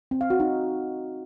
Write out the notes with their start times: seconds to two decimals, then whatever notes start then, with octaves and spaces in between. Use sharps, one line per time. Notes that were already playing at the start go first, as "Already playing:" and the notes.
0.11 C4
0.21 F5
0.30 F#4
0.40 D#4